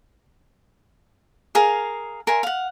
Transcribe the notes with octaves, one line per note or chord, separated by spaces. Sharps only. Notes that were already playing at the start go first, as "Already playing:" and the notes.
G#4 A#4 F5
A#4 E5 G#5 C6
F5 F#5